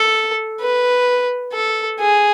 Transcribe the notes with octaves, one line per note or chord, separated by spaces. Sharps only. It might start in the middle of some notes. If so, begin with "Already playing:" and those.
Already playing: A4
B4
A4
G#4